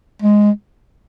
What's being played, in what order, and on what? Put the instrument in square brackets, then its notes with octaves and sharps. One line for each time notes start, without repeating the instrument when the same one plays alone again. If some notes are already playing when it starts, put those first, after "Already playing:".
[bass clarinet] G#3